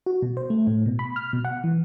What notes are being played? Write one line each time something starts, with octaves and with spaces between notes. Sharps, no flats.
F#4
B2
C5
A3
A2
B2
B5
F6
B2
F#5
E3